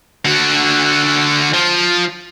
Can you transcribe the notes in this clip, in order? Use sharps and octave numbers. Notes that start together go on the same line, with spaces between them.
D3 F#4
F3